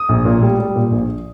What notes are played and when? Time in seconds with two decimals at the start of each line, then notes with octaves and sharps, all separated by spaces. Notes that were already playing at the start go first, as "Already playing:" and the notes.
Already playing: D#6
0.09 A#1
0.25 A#2
0.42 G3
0.59 G3
0.76 A#2
0.92 A#1